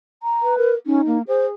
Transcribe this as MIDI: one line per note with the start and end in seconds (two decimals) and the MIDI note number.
0.23 0.57 82
0.42 0.71 71
0.58 0.75 70
0.86 1.01 61
0.86 1.18 63
1.06 1.22 58
1.28 1.52 68
1.28 1.45 72